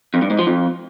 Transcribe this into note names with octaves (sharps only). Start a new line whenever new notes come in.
F2
G2
G#2
F3
F2